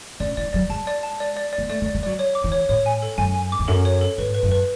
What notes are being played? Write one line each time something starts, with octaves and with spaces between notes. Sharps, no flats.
C#3 D5
E3 D5
F#3 D5
G#3 A5
D5
A5
D5
D5
D5
B3
A3 D5
A3
D5
G#3
F#3 D5
C#5
D6
E3
C#5
A2 C#5
G#5
A4
F#2 G#5
G#5
D6
E2
F#2 A4
C#5
A4
G#2 B4
B4
F#2
B4